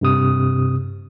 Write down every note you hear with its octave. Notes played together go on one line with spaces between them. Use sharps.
G2 C3 D#6